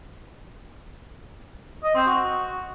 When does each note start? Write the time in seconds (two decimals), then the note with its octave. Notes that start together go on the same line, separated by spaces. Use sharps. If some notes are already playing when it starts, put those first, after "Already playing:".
1.83 D#5
1.95 C4
2.06 F#4